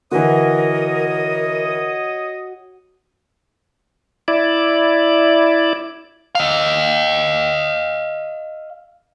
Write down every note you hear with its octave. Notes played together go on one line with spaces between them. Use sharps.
D3 E3 F#4 A#4 C#5 D#5 D#6
E4 D5
D#5 F5